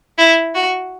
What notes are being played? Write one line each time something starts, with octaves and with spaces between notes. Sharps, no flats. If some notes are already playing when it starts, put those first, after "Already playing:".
E4
F#4